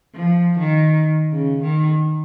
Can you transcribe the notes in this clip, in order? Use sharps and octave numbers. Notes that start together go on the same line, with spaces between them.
F3
D#3
C#3
D#3